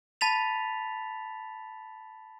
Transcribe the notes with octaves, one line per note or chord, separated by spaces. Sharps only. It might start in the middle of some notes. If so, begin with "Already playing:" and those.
A5 B5 A6 B6 F7